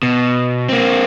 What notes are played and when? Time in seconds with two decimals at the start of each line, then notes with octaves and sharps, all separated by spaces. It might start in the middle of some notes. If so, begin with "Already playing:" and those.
0.03 B2
0.69 A#3 C4